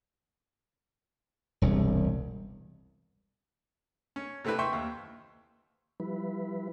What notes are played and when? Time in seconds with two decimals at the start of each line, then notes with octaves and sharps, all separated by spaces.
1.62 E1 C2 G2
4.16 C#4
4.45 C3 A3 C4 E4 B4
4.59 E5 G5 C6 C#6
4.73 D#2
6.00 F3 G3 E4 B4